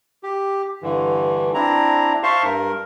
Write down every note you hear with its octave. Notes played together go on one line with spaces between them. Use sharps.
G4
G2 D3 E3
C4 D4 E4 A#5
C5 E5 F5 A5 C6 C#6
G2 A#4